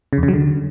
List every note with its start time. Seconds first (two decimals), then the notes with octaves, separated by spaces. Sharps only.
0.13 C#3
0.18 E2
0.23 C#3
0.28 F#3
0.34 D3